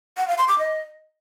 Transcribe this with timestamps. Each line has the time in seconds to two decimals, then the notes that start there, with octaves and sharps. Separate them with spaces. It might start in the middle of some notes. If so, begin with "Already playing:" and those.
0.17 F#5
0.28 F5
0.38 C6
0.48 D6
0.59 D#5